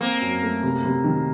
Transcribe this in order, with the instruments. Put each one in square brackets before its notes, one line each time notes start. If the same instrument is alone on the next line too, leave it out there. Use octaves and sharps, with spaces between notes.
[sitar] A#3 [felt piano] C4
[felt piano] F#2
A3
C3
C3
D#3